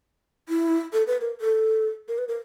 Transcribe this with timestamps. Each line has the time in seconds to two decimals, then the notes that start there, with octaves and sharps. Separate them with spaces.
0.49 E4
0.93 A4
1.07 B4
1.21 A#4
1.41 A4
2.08 A#4
2.18 B4
2.28 A#4